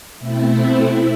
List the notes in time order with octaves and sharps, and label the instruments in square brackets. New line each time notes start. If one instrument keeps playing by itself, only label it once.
[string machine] B2 A3 C4 E4